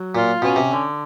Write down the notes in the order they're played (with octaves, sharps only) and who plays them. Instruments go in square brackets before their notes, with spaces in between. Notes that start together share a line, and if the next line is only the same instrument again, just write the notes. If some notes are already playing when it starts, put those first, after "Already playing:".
Already playing: [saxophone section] F#3
[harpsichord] A#2 [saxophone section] F4
[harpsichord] B2 [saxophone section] C#4
[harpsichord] C3
[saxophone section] D3